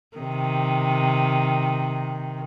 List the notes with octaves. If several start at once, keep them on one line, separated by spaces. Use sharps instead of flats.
C3 D#3